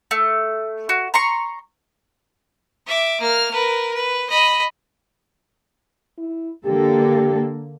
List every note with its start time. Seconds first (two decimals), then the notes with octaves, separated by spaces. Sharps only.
0.11 A3
0.89 F#4
1.14 A#5 C6 C#6
2.87 E5 D6
3.20 A#3 F6
3.51 A#4 B4
3.94 B4
4.30 D#5 B5
6.19 E4
6.66 D3 A#3 G4 A4